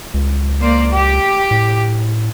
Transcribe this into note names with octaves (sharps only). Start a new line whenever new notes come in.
C#2
A#3 C5 D5
G4
A2